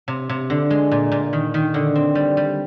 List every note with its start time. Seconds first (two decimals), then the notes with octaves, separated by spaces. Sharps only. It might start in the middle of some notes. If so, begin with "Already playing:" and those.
0.08 C3
0.29 C3
0.50 D3
0.70 G#3
0.91 A#2
1.12 A#2
1.33 D#3
1.54 D#3
1.74 D3
1.95 C4
2.15 G3
2.37 G3